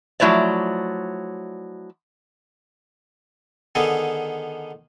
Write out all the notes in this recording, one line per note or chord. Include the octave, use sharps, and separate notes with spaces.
F3 F#3 A3 E4 C#5 D5
D3 D#3 B3 G#4 A4